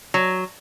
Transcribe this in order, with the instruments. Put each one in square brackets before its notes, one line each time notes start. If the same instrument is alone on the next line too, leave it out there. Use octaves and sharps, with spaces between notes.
[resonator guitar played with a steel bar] F#3